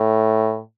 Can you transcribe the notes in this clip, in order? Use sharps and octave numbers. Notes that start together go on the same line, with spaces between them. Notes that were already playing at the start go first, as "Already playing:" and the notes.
Already playing: A2